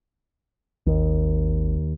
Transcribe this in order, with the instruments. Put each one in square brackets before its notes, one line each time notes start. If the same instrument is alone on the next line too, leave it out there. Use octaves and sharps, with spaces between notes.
[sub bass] G#1 [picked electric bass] D#2